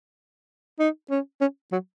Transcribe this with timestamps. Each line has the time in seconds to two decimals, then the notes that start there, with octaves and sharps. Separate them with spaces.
0.79 D#4
1.10 C#4
1.41 C#4
1.72 F#3